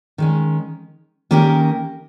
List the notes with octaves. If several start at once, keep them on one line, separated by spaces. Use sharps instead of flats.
D#3 G#3 C#4
D#3 A#3 C#4 G4 A#4